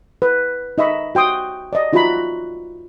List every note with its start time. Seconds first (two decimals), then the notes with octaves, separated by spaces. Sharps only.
0.22 B4
0.78 D#4 D#5 E5 B5 C#6
1.15 F#4 G5 C6 D#6
1.73 D5 D#5
1.93 D#4 F4 F#4 E5 A#5 B5